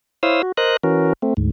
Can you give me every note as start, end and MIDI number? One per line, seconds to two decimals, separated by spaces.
0.23 0.42 64
0.23 0.42 72
0.23 0.42 73
0.23 0.42 77
0.23 0.42 87
0.23 0.42 88
0.43 0.52 66
0.57 0.77 70
0.57 0.77 72
0.57 0.77 75
0.57 0.77 87
0.57 0.77 90
0.83 1.13 52
0.83 1.13 61
0.83 1.13 66
0.83 1.13 70
1.22 1.34 57
1.22 1.34 60
1.37 1.50 38
1.37 1.50 44